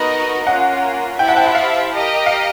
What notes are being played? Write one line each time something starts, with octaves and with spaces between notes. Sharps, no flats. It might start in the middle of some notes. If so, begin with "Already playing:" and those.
Already playing: B3 D#4 F#4 A#4 D#5
A#3 C#4 F4 F#5
E4 G4 C5 E5 G5 A5
F#5
G5
F#5
F5
G4 A#4 D#5
F5